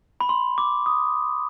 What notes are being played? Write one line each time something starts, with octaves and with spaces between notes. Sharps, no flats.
B5
C6
D6
D#6